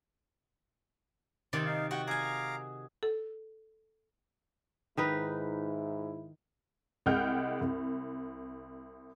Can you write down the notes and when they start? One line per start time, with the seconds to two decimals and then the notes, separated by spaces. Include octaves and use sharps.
1.53 C3 D#3 D5
1.66 D#4 F5
1.91 F#4 G4 G5 C#6
2.07 G#4 F5 G#5 A#5 D6
3.03 A4
4.97 G#2 D#3 D#4 E4 B4
7.06 C2 G#3 F#5 G5 F6 G6
7.61 C2